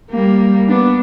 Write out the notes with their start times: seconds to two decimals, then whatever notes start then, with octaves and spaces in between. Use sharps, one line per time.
0.11 G3 A#3
0.68 B3 D4